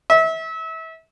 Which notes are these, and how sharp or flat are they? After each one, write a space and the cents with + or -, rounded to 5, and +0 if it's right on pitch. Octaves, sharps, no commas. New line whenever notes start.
E5 -30